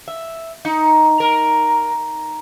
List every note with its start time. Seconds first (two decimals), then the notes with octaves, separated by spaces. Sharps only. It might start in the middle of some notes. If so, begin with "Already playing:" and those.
0.08 E5
0.65 D#4
1.20 A#4